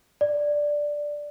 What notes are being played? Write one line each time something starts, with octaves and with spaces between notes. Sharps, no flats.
D5